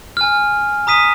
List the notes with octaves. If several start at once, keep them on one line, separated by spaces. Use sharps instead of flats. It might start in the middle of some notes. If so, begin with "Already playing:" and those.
G#5 F6
A#5 D#6 B6 D#7